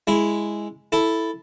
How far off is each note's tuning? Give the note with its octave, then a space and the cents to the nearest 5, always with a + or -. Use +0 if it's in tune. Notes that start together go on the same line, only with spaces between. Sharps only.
G#3 +0 E4 +0
E4 +0 A4 +0